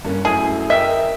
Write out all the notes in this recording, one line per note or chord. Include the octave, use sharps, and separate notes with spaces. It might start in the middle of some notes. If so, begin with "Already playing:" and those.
G2 A#3 C#4
F#2 A3 E4 G#4
A#4 D#5 E5 G5